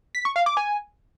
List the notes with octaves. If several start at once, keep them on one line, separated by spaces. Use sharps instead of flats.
B6
C#6
F5
D6
G#5